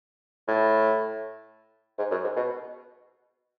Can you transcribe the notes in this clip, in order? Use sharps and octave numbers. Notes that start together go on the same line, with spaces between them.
A2
G#2
F#2
G#2
B2